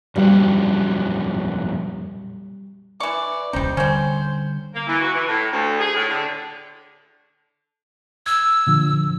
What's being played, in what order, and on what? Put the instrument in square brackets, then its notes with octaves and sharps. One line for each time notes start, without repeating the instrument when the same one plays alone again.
[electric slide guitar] F2 A#2 F#3 [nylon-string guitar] G3 F5
[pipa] E3 C#6 [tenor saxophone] D5
[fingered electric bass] D#1 C2 C#4 [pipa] G3 D#4 [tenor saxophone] C5
[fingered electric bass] D3 G3 [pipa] C4 C#4 [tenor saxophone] C5
[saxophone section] A#3
E3
F#4
E3
A2
D2
G#4
A2
D3
[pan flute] E6 [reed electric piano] G#6
[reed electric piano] A#2 D3 F3